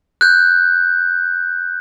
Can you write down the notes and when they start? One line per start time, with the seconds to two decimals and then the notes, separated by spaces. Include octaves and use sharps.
0.21 F#6 G6